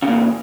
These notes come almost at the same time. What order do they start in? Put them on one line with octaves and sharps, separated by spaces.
C#3 A#2 E2